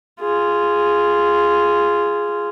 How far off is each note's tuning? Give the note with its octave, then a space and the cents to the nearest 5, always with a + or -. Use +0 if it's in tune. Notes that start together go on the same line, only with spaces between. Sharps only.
F4 -10 G#4 +0